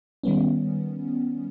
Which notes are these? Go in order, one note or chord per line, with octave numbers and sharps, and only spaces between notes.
D#3 G3 B3 C#4